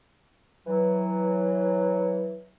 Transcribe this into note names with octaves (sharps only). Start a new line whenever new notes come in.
E3 F#3